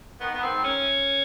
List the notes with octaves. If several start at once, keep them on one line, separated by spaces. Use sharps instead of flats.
D#3 B3
D#3 B3
C4
G#2
C#4